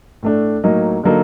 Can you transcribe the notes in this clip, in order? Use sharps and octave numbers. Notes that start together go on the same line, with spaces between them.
A2 A3 D4
A2 F#3 A#3 D#4
D3 F#3 A#3 D#4 A4